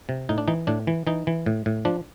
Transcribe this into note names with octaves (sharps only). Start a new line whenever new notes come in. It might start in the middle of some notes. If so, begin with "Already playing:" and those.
C3
A2 D#4
D4
E3 D#4
A2 D4
E3
E3 D#4
E3
A2
A2
F3 D4